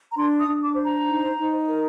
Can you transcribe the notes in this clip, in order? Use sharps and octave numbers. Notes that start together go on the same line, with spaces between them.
A#5
D4 C6
D#6
D4
D6
C5
A#5
D#4
D#4
A#4